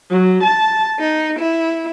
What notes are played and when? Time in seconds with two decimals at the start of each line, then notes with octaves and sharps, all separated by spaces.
0.10 F#3
0.43 A5
0.99 D#4
1.38 E4